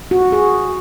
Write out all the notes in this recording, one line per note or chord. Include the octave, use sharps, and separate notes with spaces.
F#4
G#4